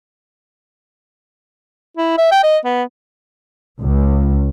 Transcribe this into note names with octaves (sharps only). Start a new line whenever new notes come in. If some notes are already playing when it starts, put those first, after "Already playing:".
E4
E5
G5
D#5
B3
C#2